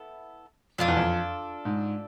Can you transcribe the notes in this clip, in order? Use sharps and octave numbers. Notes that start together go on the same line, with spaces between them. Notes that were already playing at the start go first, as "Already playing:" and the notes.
Already playing: B3 E4 A4
F2 D4 F4 A4
E2
F2
G#2